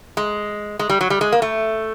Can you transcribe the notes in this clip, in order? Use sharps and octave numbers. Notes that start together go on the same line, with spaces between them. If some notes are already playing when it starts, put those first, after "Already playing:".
G#3
G#3
G3
F#3
G3
G#3
A#3
A3